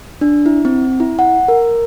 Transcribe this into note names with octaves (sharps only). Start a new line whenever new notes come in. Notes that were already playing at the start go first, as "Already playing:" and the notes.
D4
E4
C4
E4
F#5
A#4